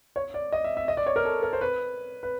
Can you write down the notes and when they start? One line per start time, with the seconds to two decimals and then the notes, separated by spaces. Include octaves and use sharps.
0.16 C#5
0.34 D5
0.53 D#5
0.64 E5
0.77 E5
0.88 D#5
0.97 D5
1.06 C#5
1.16 A#4
1.25 A4
1.42 A#4
1.53 C5
1.61 B4
2.23 B4